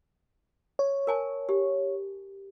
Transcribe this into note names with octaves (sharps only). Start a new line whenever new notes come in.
C#5
A#4 G#5 A5
G4